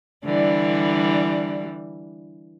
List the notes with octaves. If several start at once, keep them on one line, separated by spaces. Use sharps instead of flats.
D3 E3 G3